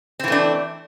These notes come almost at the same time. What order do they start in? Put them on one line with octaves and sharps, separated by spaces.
C4 E3 A3 D4